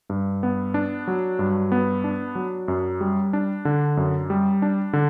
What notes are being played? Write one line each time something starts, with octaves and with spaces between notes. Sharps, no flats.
G2
B3
D4
F#3
G2
B3
D4
F#3
F#2
G3
D4
D3
F#2
G3
D4
D3